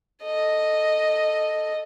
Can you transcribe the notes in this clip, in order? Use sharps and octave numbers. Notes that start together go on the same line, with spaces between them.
A4 D#5